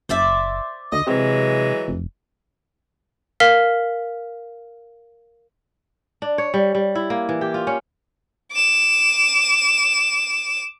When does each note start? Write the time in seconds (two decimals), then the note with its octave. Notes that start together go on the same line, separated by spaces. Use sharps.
0.09 F#1 C5 D5 E5
0.92 D2 D#5
1.07 C3 E3 F#3 G#3
1.88 F1
3.40 A#4 F5 F6 B6
6.22 D4
6.38 C#5
6.54 G3
6.75 G3
6.95 E4
7.10 A#3
7.29 E3
7.41 G4
7.54 F4
7.67 C#4
8.52 D6 E7